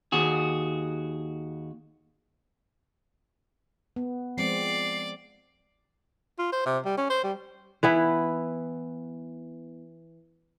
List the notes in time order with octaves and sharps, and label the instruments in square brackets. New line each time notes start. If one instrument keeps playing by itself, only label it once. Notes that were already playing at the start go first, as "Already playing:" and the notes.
[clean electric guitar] D#2 F#4 G#4
[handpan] B3
[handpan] F3 G#3 C4 [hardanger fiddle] D5 [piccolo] C7
[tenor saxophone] F4
C5
C3
G3
C#4
C5
G3
[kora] E3 B3 E4